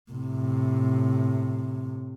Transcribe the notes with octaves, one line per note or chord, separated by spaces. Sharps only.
A2 C3